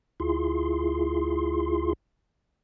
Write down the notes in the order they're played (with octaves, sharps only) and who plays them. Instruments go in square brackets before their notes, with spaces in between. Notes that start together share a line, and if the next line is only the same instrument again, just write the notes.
[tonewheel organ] D2 E4 F4 G#4 C6